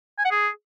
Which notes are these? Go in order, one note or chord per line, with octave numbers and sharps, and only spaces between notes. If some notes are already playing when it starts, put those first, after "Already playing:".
G#5
F#5
G#4